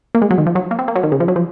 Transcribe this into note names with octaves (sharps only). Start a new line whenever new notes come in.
A#3
G#3
F#3
D#3
F3
F#3
A#3
C4
A#3
F#3
D#3
C#3
F3
F#3
F3